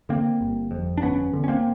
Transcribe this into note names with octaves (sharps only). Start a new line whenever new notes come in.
D3 A#3 C4
G1
F2
D4
G1 B3 C#4
D3
C#4
A#3 C4